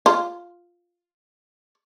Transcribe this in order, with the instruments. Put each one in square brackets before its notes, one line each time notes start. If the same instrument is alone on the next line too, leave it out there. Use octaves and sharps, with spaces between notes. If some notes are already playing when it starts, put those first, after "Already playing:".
[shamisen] F4